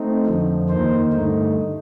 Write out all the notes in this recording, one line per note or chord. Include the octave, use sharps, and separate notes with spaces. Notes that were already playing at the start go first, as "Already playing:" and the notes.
Already playing: A3 C4 D#4
F2 D3 F3
D#2 D#3 A#3 D#4 C5
G2 D3 A3 D#4